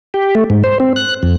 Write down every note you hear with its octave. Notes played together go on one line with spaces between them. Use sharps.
G4
A3
G#2
C5
C4
F#6
F2